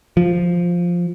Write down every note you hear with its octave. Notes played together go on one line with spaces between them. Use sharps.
F3